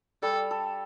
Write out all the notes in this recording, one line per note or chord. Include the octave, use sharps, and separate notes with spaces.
G3 A4
A4